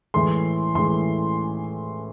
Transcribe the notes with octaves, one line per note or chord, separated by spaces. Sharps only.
A2 E3 G#3 C6
A2 E3 G#3 C6